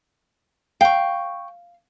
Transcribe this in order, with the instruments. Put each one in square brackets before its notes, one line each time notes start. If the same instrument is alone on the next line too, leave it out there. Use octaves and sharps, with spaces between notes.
[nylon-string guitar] F5 [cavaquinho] G5 C#6